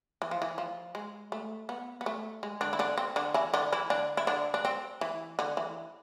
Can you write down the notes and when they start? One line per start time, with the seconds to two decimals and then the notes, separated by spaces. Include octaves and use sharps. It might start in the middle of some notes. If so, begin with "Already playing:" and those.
0.22 E3
0.31 F3
0.42 E3
0.58 F3
0.95 G#3
1.32 A3
1.69 B3
2.01 B3
2.06 A3
2.43 G#3
2.61 D3 D4
2.73 E4
2.79 D3 D4
2.98 C4
3.16 D3 D4
3.34 E3 E4
3.54 D3 D4
3.72 E3 E4
3.90 D3 D4
4.17 E4
4.27 D3 D4
4.54 D4
4.65 C4
5.01 E3
5.39 D3
5.57 E3